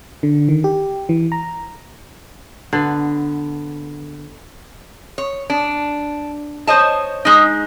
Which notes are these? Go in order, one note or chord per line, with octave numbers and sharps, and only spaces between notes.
D3
D#3
G4
E3
A#5
D3 B3
C#5
D4
C5 C#5 D#5 A5
G#3 D#4